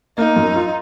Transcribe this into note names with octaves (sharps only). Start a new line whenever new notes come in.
A#3 D#4
F#2
F4